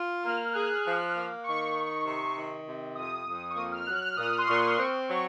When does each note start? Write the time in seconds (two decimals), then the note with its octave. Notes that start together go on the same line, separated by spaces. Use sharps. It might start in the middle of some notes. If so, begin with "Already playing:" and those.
Already playing: F4
0.23 A#3 F6
0.53 G#4 F#6
0.83 F3
1.14 A#3 F6
1.44 D#3 C#6
1.74 D#4
2.05 C3
2.35 D#3
2.65 C3
2.95 F2 D#6
3.26 F2
3.51 C#6
3.56 A#3 D#6
3.72 F6
3.87 F#3 F#6
4.02 F6
4.16 A#2 D#6
4.38 C6
4.47 A#2 C#6
4.77 C4 C#6
5.08 F#3 C#6